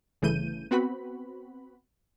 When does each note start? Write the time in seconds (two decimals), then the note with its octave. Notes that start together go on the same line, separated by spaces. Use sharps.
0.22 G1 C#3 E3 A3 G6 D#7
0.71 B3 C4 F#4 B4 B5